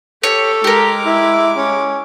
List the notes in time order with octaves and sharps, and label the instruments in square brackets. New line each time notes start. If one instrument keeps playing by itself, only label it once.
[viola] G4 [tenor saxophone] A4 [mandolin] C#5
[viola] G#3 D6 [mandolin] G4 A#4
[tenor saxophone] E4
C#4